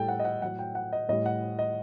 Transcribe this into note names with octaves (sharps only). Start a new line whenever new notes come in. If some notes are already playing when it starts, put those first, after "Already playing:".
Already playing: A2 G3 A4 G5
F#5
D#5
F#5
A2 F#3 F#5
G5
F#5
D#5
A2 G3 D#5
F#5
D#5